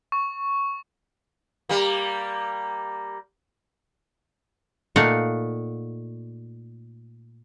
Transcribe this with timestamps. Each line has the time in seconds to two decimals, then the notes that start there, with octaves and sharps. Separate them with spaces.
0.12 C#6
1.69 G3 A#3
4.96 A#2 A3 D#4 F5 F#5